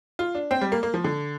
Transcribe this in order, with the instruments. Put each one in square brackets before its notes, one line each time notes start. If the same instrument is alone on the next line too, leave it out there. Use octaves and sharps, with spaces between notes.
[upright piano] F4
D4
C4
G3
A#3
A#3
F3
D3